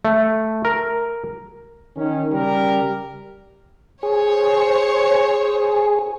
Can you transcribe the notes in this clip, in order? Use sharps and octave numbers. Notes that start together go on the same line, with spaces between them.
A3
A#4
D#3 C#4
C#3 G3 G4 A#4
G#4 C5 C#5